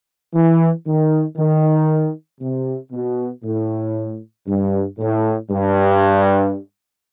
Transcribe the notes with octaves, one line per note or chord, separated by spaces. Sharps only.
E3
D#3
D#3
C3
B2
A2
G2
A2
G2